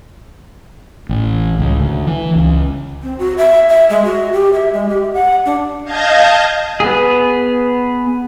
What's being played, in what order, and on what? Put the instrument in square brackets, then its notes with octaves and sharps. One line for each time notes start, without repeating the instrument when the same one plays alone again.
[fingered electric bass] A1
C#2
D2
E3
C#2
[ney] C4
F#4
E5
E5
G#3
F#4
G4
E5
G#3
G4
F#5
D4
[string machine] D#5 F5 A5 G6 G#6 A#6
[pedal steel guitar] B3 G#4